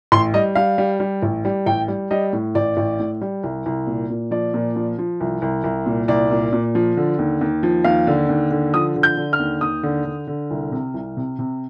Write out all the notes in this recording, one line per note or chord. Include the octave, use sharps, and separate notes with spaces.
A1 C6
G3 D#5
G3 F5
G3
G3
A1
G3
A1 G5
G3
G3 D#5
A2
A1 D5
A1
A2
G3
C2
C2
A#2
A#2
F3 D5
A#2
F3
F3
C2
C2
C2
A#2
C2 D5
A#2
A#2
F3
D3
D#2
D#2
F3
D#2 F5
D3
D#2
D3
F3 D#6
D3
G6
D3
F6
D#2
D#2 D#6
D3
D3
D3
C2
C3
C2
C3
C3